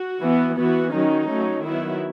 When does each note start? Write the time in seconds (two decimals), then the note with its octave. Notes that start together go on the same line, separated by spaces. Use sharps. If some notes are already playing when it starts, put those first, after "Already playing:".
Already playing: F#4
0.23 E3 B3
0.58 E3 B3 F#4
0.94 D#3 F#3 C#4 D#4
1.29 F#3 A3 C#4
1.65 D#3 F#3 B3 E4